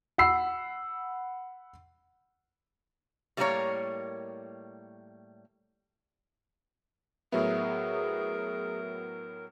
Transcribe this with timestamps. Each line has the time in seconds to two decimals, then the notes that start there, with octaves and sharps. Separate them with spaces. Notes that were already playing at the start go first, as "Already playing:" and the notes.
0.18 F#5 B5 E6 C7
3.37 A2 G3 A#3 B3 A#4 C#5
7.32 A2 F#3 B3 G#4 A#4 E5